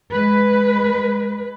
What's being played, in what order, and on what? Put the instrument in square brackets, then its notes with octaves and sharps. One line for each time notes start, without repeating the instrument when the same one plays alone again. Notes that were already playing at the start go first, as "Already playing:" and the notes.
[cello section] G#3 B4